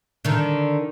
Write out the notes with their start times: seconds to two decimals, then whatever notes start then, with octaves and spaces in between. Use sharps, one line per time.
0.25 D3 D#3